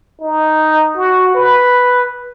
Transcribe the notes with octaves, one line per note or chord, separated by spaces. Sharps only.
D#4
F#4
B4